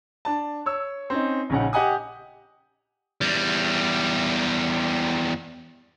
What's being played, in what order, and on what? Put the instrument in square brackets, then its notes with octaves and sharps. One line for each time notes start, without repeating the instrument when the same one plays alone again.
[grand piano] D4 A5
C#5 E6
C4 C#4 D#4
A#1 C#3 C#4 D#4 F#5
G4 D#5 F#5 G#5 D#6
[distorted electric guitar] E2 G3